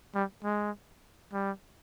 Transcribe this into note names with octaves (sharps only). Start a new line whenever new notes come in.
G3
G#3
G3